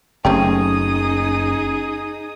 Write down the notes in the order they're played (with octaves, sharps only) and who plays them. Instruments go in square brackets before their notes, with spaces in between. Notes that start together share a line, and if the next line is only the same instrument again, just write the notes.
[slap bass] F#1 [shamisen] A3 C4 G4 [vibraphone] C#4 [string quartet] D#4 G#4 D#6